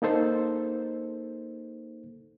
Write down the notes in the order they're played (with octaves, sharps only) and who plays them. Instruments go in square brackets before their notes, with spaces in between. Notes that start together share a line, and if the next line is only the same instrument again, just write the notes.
[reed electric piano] A#3 D#4 A4 C5